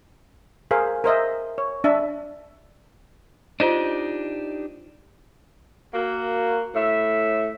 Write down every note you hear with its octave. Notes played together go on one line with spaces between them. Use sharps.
G#4 A#4 C5 F5
A#4 C5 D#5 E5
C#5
D4 E5
D4 D#4 F4 G4 C5 D#5
A#3 F#4
A2 E5